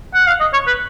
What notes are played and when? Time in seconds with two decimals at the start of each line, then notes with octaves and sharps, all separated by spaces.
0.14 F#5
0.27 F5
0.40 D#5
0.53 C#5
0.67 B4